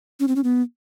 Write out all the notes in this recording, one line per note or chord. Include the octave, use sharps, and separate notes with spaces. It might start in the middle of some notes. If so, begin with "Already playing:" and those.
C#4
C4
C#4
B3